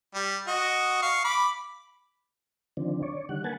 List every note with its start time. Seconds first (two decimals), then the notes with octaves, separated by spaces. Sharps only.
0.15 G3
0.47 F#4 D#5
1.02 F5 C#6
1.24 B5 D6
2.77 D3 D#3 F3 C4 D4
3.03 C#5 D5
3.29 D3 D#3 G3 F#5
3.44 A#3 B4 F#5 G#5 A5